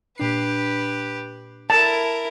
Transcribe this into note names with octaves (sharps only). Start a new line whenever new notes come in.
A#2 D4 G4 B4 C7
E4 A#4 A5